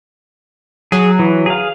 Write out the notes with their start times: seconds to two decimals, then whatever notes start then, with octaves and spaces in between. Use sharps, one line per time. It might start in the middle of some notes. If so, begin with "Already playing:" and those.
0.92 F#3 G#4
1.19 E3
1.46 G#4 F5